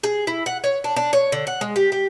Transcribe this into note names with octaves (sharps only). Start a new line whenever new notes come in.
G#4
E4
F#5
C#5
D4
D4
C#5
D3
F#5
G#3
G4
G4